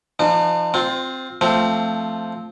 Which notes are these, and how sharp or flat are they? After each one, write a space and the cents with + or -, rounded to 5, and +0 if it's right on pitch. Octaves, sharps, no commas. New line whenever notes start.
F3 -25 D#4 -45
C4 +0 F4 +20
F3 +0 A3 +10 C4 +0